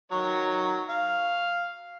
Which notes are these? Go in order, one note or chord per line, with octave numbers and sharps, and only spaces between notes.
D#3 F#3 C#5
F5